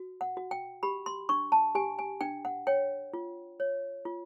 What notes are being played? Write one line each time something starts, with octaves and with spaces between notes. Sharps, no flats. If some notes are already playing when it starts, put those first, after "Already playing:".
Already playing: F#4
F#5
F#4
G5
G4 B5
C6
D4 C#6
A5
G4 G#5
G#5
D4 G5
F#5
C#5 G5
F4
C#5
F4